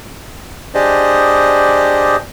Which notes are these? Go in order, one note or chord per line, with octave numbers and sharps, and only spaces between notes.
D4 G4 G#4 C5 D5 D#5